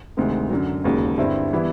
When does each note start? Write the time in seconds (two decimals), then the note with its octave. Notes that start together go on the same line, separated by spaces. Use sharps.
0.17 D2 C3 D#3 G#3
0.50 F#2 D3 F#3
0.84 E1 D#2 C#3 F#3
1.18 G2 D3 G3 C4 E4
1.53 E3 G3 B3 E4